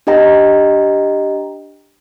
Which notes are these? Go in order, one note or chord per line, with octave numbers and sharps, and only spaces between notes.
D4 G4 D#5 G5 A#5